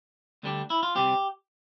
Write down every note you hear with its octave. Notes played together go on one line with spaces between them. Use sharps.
D2 D3 G3 B3 D4
E4
F4
C3 G3 C4 G4